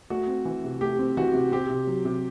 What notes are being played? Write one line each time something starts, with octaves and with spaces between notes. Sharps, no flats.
A3 F#4
C4
E3
C3
A3 G4
C4
E3 F#4
C3
C4 G4
C3
F#3
C3